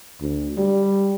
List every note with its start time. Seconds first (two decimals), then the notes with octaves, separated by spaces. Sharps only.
0.21 D2
0.57 G3